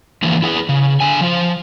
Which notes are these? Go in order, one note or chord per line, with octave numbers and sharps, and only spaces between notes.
D3 E3 F3 A#3
E4 G#4 B4
C#3
D3 G#5
F3 C5